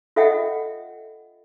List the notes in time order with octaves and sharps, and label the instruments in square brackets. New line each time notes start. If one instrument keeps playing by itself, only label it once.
[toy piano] F4 A4 D#5 E5 F#5 G5